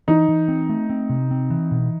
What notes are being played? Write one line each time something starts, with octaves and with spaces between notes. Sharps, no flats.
E3 D#4
E3
C4
A3
C4
C3
C4
E3
B2